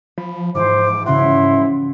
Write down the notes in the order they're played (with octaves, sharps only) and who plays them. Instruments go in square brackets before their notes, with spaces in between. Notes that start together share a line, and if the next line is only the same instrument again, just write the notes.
[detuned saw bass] F3 [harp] B5
[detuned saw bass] G#2 [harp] E3 F3 [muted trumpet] C5 [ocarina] D6
[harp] C#3 F#4 F#5 [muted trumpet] E4 [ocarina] C6